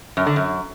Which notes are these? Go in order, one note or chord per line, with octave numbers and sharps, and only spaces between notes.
F#2
D3
F#2